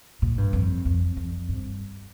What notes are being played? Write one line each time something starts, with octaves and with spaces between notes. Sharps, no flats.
A#2
G2
F2
F2
F2
G2